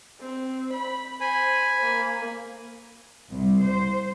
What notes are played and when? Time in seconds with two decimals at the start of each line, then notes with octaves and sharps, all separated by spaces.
0.20 C4
0.73 B5
1.21 C5 G#5 B5
1.81 A#3
3.32 C2
3.63 C5